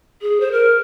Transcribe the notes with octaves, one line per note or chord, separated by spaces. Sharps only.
G#4
C5
A#4